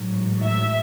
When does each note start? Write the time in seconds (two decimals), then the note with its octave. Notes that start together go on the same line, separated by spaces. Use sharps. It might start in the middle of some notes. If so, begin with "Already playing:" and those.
Already playing: A1 G#2 F#3
0.43 E5